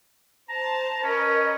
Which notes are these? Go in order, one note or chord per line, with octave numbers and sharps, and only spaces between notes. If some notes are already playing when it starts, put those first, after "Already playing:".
C5 A5 A#5
C#4 A#4 B4 D#5